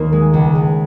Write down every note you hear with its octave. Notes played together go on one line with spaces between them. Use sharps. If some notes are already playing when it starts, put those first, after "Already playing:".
Already playing: D#2 A#3
G#3
C#2
C#2